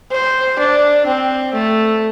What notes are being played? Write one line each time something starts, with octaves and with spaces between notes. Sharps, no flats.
C5
D4
C4
A3